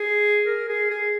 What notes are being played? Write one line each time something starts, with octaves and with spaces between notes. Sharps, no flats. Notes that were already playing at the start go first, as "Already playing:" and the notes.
Already playing: G#4
A#4
G#4
G#4